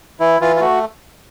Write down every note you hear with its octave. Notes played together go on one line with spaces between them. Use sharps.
E3 E4
E3 F4
F4
A3 F#4